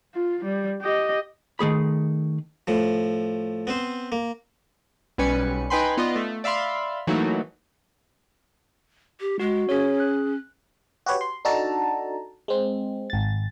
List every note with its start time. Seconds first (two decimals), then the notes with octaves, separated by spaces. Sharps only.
0.14 F4
0.44 G3
0.81 G4 D#5
1.59 D#3 A3 G#4 B5
2.67 A2 F3
3.67 B3 C4 C5
4.12 A#3
5.18 B1 G3 C#4 B4 G#5 C#7
5.70 D#4 B4 G5 G#5 B5 C6
5.97 B3 F4 D5 D#5
6.16 A3
6.44 D5 E5 F5 B5 C6
7.07 E3 F#3 A3 A#3 D#4 F#4
9.20 G4
9.40 G#3 F#4
9.69 C#4 G#4 C#5
10.00 F#6
11.06 F#4 G4 B4 C#5
11.21 C6
11.45 D4 D#4 F#4 A4 A5 A#5
12.48 G#3 C4
13.10 G#1 A6